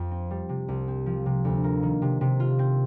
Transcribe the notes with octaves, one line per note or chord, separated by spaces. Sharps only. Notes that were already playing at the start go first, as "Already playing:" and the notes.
Already playing: F2
C4
G3
C3
C2
C4
F3
C3
D2
A#3
D#3
C3
C3
F4
C4